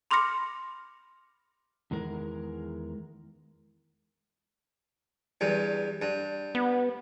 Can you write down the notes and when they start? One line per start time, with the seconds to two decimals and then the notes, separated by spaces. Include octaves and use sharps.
0.11 B5 C6 D6 F6 A#6 C#7
1.91 E2 D#3 G#3 A#4
5.41 E2 G2
6.02 G2
6.55 B3